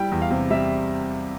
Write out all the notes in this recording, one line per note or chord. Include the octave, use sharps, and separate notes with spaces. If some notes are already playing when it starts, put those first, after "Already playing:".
Already playing: G3 E4 G5
E2
F5
C3
G3 E5